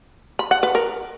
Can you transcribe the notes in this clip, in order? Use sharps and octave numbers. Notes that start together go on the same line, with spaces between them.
B5
F#5
B4
A#4